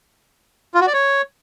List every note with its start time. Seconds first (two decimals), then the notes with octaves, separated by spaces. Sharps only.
0.74 F4
0.81 F#4
0.87 D5
0.93 C#5